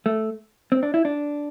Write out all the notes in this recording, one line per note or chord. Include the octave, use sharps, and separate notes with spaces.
A3
C4
D4
E4
D4